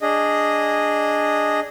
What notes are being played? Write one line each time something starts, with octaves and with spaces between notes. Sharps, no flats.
D4 G#4 D#5